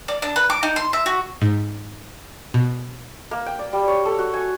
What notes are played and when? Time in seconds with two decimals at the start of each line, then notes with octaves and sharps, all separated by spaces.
0.08 D5
0.22 D4
0.36 B4
0.50 D6
0.63 D#4
0.76 C6
0.93 E5
1.06 F#4
1.42 G#2
2.54 B2
3.31 A#3
3.46 G5
3.59 D5
3.73 G3
3.88 C#5
4.05 A4
4.18 F#4
4.34 G#5